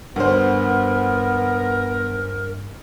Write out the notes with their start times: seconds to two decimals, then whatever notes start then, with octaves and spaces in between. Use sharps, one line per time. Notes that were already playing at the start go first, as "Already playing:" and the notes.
0.16 D2 G2 B3 A#4 C5